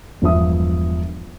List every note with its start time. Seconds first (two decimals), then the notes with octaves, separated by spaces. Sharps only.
0.22 E1 G2 F3 E5 D#6